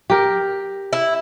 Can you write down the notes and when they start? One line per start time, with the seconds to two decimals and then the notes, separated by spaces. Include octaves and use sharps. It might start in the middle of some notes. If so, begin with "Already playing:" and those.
0.10 G4 A#4
0.93 E4